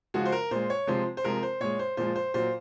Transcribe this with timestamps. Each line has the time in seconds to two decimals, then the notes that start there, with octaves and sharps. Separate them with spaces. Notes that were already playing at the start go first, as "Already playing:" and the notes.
0.14 C#3 F3 G#3 F#4
0.25 C5
0.32 A#4
0.51 A#2 G#3 C5
0.70 C#5
0.87 C3 F3 G#3 C5
1.17 C5
1.24 C3 F3 G#3 A#4
1.43 C5
1.60 A#2 G#3 C#5
1.79 C5
1.97 A#2 F3 G#3 C5
2.16 C5
2.34 A#2 F#3 C5